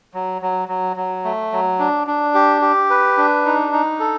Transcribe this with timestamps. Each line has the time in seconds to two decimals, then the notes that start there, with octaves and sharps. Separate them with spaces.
0.14 F#3
0.42 F#3
0.68 F#3
0.96 F#3
1.24 A3
1.52 F#3
1.79 D4
2.07 D4
2.34 G4
2.62 G4
2.90 B4
3.17 D4
3.45 D#4
3.73 D#4
4.00 A4